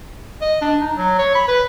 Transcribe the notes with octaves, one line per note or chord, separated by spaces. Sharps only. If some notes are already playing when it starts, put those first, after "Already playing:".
D#5
D4
D#4
F#3
C#5
B5
B4